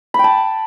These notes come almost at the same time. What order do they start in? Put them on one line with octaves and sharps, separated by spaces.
B5 G5 A5